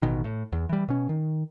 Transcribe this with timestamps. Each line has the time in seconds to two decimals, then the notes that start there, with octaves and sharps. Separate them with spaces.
0.02 A1 B2 D#3
0.24 A2
0.52 E2
0.69 E3 G3
0.88 B2 C#4
1.09 D#3